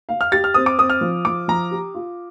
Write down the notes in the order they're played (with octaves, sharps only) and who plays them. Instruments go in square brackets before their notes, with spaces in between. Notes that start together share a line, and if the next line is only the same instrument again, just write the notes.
[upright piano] F5
[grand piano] F6
[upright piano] G4 [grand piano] A6
[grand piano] F6
[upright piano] C4 [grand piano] D#6
[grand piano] D6
[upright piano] C4 [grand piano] D#6
[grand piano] F6
[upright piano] F3
[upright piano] F3 [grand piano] D6
[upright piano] F3 [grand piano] A#5
[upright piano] G4
F4